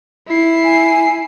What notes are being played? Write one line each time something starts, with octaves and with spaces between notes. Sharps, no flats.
E4 C7
G#5